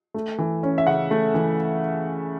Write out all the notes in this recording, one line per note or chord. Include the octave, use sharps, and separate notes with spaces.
A3
E3
C#4
E5
C#3 F#5
A3
E3